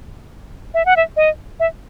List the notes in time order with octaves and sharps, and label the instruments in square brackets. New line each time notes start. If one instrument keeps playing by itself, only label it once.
[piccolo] E5
F#5
E5
D#5
E5